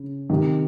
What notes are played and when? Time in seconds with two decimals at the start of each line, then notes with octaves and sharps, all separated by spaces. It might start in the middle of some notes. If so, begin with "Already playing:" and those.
Already playing: C#3
0.30 C3 D#3